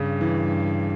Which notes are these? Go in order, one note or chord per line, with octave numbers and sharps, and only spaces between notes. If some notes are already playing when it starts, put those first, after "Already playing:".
Already playing: G2 C#3
E3